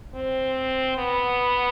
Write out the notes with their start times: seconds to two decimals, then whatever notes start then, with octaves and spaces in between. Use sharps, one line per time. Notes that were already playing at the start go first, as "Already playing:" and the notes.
0.15 C4
0.98 B3